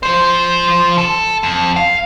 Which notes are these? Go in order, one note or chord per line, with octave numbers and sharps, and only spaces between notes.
F3 C5
A4
F2
F5